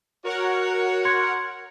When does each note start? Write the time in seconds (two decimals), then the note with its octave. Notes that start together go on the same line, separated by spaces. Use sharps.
0.25 F#4 A#4 C#5 F#5
1.05 C6 G#6 C#7